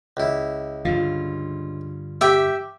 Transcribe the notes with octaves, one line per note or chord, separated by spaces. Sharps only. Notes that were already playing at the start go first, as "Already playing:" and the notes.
C#2 E4
G2 D3 F4
G4 E5 G5